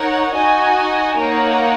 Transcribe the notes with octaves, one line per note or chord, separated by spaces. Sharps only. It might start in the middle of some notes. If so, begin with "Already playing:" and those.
Already playing: D#4 A#4 C#5 F#5
D#4 F#4 D#5 G#5
A#3 D#4 A#4 C#5 F#5